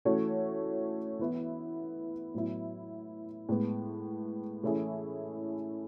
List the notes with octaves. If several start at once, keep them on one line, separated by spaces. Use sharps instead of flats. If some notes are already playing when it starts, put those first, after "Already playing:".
E3 A3 C#4 F#4 C#5
E3 B3 E4
A2 F#3 B3 E4
A2 G#3 B3
E3 A3 C#4 E4 G#4